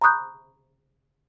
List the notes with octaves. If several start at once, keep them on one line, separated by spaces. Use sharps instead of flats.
A#5 B5 C#6 D#6 F#6 G6